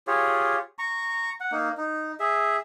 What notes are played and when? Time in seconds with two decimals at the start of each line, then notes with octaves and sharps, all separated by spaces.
0.07 F4 G4 G#4 C#5
0.79 A#5 C#6
1.40 F#5
1.52 A#3 D#4
1.77 D#4
2.20 G#4 E5